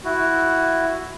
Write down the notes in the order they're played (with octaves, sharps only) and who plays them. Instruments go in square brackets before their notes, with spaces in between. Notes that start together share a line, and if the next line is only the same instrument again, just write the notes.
[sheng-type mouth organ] E4 F#4